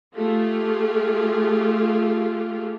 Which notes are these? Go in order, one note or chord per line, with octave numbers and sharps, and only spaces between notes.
A3 F4 G4 G#4